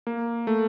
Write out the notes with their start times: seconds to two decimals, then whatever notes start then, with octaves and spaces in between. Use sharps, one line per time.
0.07 A#3
0.47 A3